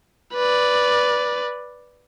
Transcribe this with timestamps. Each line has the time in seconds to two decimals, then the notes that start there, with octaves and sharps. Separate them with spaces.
0.34 B4 D5